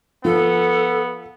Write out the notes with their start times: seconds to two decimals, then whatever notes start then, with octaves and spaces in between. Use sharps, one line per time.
0.25 F3 B3 A4